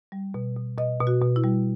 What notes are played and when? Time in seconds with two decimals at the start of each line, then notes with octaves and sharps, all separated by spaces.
0.12 G3
0.34 B2
0.57 B2
0.78 B2 D#5
1.00 B2
1.07 F#4
1.22 B2
1.36 E4
1.44 G3